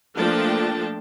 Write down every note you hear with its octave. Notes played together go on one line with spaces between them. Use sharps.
F3 A3 A#3 D4 G5 A5